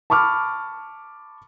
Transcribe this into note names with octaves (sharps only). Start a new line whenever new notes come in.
A5 B5 C#6 D6 F6